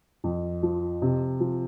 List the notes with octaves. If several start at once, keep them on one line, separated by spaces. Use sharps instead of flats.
F2
F3
C3
F3